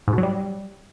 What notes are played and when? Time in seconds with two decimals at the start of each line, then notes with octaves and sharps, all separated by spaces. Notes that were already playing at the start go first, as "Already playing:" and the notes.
0.08 G#2
0.13 B2
0.18 F#3
0.23 G3